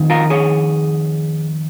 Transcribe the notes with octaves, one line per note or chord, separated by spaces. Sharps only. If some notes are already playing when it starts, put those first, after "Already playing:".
Already playing: F2 D#3
F4 A#4
G#4 C#5